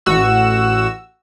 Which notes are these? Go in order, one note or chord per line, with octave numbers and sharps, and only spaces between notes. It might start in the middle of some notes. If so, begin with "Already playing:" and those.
A1 F#4 E6